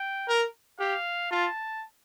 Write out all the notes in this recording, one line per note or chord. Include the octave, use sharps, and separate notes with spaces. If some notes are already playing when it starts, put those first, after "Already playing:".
Already playing: G5
A#4
G4 F5
F4 A5